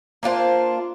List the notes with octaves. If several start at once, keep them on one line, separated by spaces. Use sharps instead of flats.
A#3 D4 F4 C5